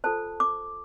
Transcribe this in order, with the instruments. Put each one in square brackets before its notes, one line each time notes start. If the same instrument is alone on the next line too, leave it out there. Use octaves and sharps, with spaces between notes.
[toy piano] F4 A4 C5 A5
D6